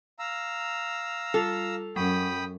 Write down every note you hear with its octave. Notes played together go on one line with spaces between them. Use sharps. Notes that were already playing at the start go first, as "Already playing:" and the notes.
F5 A#5 E6
G3 F4 A4 F7
F#2 F#3 G5 B5 D#6